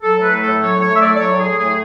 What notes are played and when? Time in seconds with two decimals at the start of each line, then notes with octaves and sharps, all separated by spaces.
0.02 F#3 A4
0.17 A2 B4
0.32 A3
0.41 A4
0.47 A2
0.61 F#3 C#5
0.76 A2
0.81 C#5
0.90 A3
0.95 E5
1.01 D5
1.06 A2
1.16 D5
1.19 F#3 C#5
1.34 A2
1.39 G#4
1.49 A3
1.60 A2 G#4